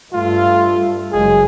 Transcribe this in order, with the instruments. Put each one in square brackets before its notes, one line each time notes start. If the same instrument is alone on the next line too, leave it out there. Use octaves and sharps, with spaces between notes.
[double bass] G2 A3 [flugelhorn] F4
[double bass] F#1 G#3 [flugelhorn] G#4